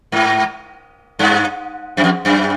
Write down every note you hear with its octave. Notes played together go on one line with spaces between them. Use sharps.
G#2
G2
F#2
F2
F#2